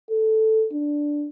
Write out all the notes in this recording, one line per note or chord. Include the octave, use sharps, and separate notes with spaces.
A4
D4